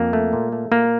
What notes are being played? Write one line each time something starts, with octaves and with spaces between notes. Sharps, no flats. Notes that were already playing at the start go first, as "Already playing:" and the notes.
Already playing: F2 A#3
A3
A#2
A3
A#2 A#3